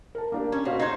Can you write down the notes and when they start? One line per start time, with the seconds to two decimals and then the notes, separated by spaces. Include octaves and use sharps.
0.15 A#4 A5
0.32 A#3 D4 G4
0.52 C#4
0.65 B2 F#4 C5 F5
0.79 D#4 C5 G#6 C7